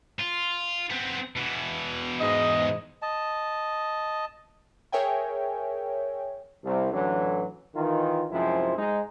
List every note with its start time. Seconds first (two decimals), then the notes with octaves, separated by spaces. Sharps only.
0.19 F4
0.90 B3 C4
1.36 B2 E3
2.20 G#2 D#5
3.02 D#5 A5
4.92 G#4 A#4 C#5 E5 G5 G#5
6.64 C2
6.93 A1 D3 E3 F#3
7.76 D#3 E3 F4
8.31 F#2 C3 F3 G#3 C4 E4
8.77 G#2 G#3 D#4